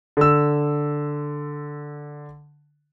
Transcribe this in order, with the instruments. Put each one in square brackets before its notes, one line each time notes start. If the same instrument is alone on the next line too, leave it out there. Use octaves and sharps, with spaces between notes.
[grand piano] D3 E6